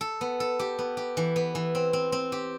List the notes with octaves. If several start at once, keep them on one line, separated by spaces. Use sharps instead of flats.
A4
B3
A4
G4
B3
G4
E3
B3
E3
C4
C4
C4
G4